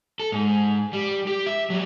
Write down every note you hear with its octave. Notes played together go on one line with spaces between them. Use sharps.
A4
G#2
G3
G4
E5
F#3 G3